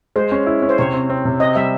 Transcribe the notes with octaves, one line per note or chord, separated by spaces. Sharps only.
G#3 C5
C#4
E4
C#4
C5
C3 C#5
C4
C4
C3
C4 D#5
G3 E5